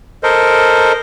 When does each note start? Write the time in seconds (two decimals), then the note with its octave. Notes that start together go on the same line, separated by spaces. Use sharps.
0.23 A4 A#4 C5 D#5